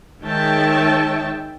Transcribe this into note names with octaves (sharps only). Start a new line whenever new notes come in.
D#3 G#3 C#5 E5 G5 A5